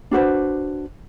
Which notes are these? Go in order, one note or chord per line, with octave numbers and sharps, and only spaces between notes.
D4 F#4 B4 C5